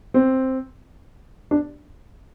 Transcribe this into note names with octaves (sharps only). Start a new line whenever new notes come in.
C4
D4